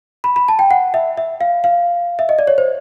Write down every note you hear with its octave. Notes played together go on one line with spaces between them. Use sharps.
B5
B5
A5
G5
F#5
E5
E5
F5
F5
E5
D#5
D5
C#5
C5